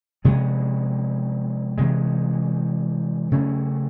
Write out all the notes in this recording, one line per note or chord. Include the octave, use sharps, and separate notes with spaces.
C3 F3 G#3 B3
C3 E3 G#3
C#3 F#3 A3 C#4